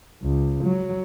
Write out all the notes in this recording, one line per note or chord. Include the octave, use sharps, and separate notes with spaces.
C#2
F#3